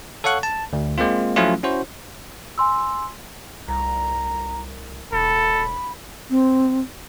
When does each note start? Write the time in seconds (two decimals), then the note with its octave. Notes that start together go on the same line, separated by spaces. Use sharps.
0.24 A4 C#5 F5 F#5 C#6 F#6
0.43 A5
0.73 D2
0.98 G#3 A#3 C4 F4
1.36 F3 F#3 A3 C#4 E4 F4
1.63 C#4 E4 F#4 C5
2.58 G#5 C6 E6
3.68 C2 A#5
5.13 E1 A4 B5
6.30 C4